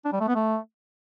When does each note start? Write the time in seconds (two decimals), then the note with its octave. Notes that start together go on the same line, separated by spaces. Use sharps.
0.05 D4
0.13 G3
0.20 A3
0.28 B3
0.35 A3